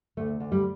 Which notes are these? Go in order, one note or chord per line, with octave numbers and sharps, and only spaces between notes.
D2 A3
D2
G3